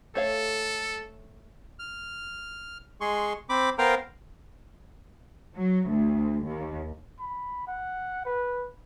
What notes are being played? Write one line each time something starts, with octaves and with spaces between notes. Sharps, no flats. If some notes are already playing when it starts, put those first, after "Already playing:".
A3 A4 C#5 F5
F6
G#3 G#4 C6 C#6
C4 B5 D6
B3 A#4 C5 F5 G5 A#5
F#3
D2
D#2
B5
F#5
B4